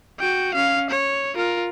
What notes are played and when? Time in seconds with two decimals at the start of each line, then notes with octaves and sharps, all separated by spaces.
0.20 F#4 G5
0.55 C#4 F5
0.91 C#5
1.36 F4 A#4